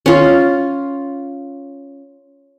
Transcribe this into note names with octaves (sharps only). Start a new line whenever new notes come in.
C#4 F4